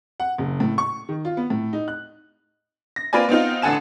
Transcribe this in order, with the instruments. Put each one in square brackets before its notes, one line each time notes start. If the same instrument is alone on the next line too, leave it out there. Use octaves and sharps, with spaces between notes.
[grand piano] F#5
F#1
A2
C#6
D#3
F4
B3
A2
D#4
F#6
[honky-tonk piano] A#6
A#3 C4 F4 B4 D5 G#5
B3 C4 D#4 F4
A1 D3 A4 F#5 G#5 E7